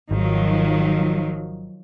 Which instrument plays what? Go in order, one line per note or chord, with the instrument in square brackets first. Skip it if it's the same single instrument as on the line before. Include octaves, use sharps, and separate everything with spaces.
[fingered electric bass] G#1 [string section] D#3 F3 F#3